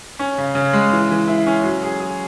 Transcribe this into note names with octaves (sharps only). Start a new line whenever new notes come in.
C#4
C#3
C#3
G#3
E3
E3
E4
C#4
F#3
G#4
G#4